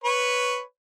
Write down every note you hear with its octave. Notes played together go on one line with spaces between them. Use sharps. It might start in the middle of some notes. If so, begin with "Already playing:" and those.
B4 C#5